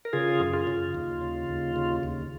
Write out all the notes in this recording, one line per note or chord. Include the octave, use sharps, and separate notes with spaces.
A#4
C#3 F4 G#4
F#2
F4
C#3
D#2
C#3
D#2
C#3
D#2